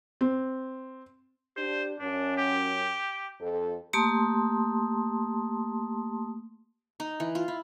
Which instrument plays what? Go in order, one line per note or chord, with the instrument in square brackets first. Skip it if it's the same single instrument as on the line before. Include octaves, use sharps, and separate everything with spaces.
[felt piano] C4
[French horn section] D4 G4 [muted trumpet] C5
[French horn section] F#2 C#4 [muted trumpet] D4
[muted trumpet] G4
[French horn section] F2 A4
[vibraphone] A3 A#3 G4 A5 C6 D#6
[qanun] D#4
E3
F4
E4